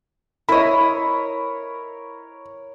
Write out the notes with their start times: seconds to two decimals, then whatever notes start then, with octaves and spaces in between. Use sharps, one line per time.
0.49 E4 A#4 C#5 D#5 B5